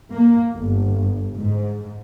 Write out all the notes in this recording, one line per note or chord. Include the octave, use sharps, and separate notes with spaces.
A#3
G1
G#2